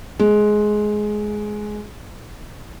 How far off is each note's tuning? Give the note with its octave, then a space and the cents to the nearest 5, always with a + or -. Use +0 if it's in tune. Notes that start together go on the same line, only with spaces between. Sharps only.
G#3 +15